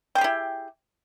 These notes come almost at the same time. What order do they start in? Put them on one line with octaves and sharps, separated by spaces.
G5 G#4 G4 E4